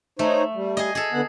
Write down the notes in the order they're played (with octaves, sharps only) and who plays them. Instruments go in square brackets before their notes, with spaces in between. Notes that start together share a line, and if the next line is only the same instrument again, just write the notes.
[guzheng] A3 [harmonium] D#4 C5 C#5
[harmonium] G3
[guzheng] G#4 D#5
G#4 A4
[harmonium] D3 B3 F#5